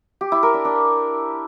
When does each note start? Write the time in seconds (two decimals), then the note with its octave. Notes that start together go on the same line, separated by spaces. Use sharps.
0.21 G4
0.32 E4
0.43 A#4
0.54 D4
0.65 D4